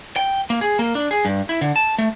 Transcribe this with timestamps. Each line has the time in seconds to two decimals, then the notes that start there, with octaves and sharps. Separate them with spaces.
0.16 G5
0.50 A#3
0.61 G#4
0.79 A#3
0.95 D4
1.11 G#4
1.25 G2
1.49 E4
1.61 D3
1.76 A5
1.98 A3